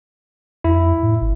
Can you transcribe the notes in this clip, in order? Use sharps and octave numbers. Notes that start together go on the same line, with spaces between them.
F2 E4
A2
G#1